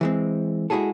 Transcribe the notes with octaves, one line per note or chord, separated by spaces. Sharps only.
E3 G#3 C4
G#3 E4 F#4 G#4 A4